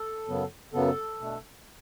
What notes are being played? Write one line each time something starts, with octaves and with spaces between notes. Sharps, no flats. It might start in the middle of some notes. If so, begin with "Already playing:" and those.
Already playing: A4
F#2 C#3 F#3 B3
F#2 C#3 F#3 B3 A4
B2 A3 D4